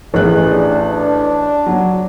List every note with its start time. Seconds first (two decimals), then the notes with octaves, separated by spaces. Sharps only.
0.14 A1 G#4 D#5 F#6
0.50 D4
0.91 D4
1.66 F#3